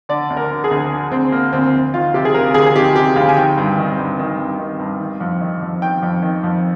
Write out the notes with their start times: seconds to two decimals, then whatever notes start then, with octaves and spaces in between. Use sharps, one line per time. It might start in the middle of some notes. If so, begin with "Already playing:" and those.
0.09 D3 D5
0.30 D2
0.37 A#4
0.50 D3
0.64 G#4
0.71 D2
0.91 D3
1.11 D2 C4
1.32 D3 A#3
1.53 D2 C4
1.74 D2
1.94 D#3 F4
2.14 C3 G4
2.25 G#4
2.34 D2 A#4
2.54 D2 G#4
2.66 G#4
2.75 D#3 G4
2.96 C3 G4
3.16 D2 F5
3.29 G#5
3.37 D#3 G5
3.57 G2
3.78 D#3
3.98 G2
4.19 D#3
4.38 G2
4.59 D#3
4.79 G2
5.00 D#3
5.20 F2
5.41 D#3
5.62 F2
5.82 D#3 G5
6.02 F2
6.22 D#3
6.43 F2